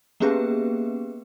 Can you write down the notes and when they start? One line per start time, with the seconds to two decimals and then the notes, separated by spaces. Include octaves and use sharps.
0.20 A#3 B3 C#4 G4 G#4 B4